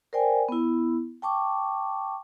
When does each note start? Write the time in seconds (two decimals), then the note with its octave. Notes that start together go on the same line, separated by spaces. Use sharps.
0.13 A#4 C5 D5 G5 G#5
0.49 B3 E4
1.22 G5 A5 C#6 D6